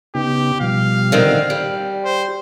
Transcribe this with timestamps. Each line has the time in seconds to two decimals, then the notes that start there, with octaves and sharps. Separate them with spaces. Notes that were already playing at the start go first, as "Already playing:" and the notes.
0.15 C#3 B3 D#4 G4
0.61 B2 F3 G3 F5
1.12 D3 D#3 C4
1.50 G3 G4
2.05 C5